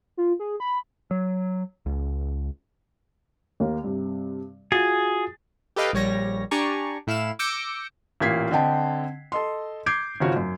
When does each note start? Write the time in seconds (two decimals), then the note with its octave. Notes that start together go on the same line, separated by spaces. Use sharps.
0.17 F4
0.40 G#4
0.60 B5
1.11 F#3
1.86 C#2
3.60 D#2 A#3
3.84 G2 C3
4.72 F4 F#4 G#4 A6
5.76 G4 A4 B4 D#5 F5 G5
5.93 A#1 G3 C#5 A#6
6.51 D4 G4 D5 G#5 A#5 C#6
7.07 A2 E4 F5 E7
7.39 D6 E6 G6 A#6 C#7 D7
8.20 A1 A#2 A#3 G#6 B6 C7
8.51 D3 C4 D#5 G5 A5
9.32 A4 D#5 C6
9.86 D6 G6 G#6 C7 D7
10.20 G#1 C#3 F3 F#4 C#5
10.36 F#2